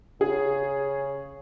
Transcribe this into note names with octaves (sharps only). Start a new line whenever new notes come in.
C#3 G#4